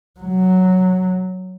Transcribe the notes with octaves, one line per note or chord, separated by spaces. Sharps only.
F#3